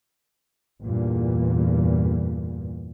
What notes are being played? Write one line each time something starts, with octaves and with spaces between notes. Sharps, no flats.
E2 G2 A#2